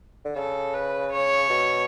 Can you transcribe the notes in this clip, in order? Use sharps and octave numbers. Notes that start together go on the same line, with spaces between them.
D3
C#3 A4
B4
C#5
B2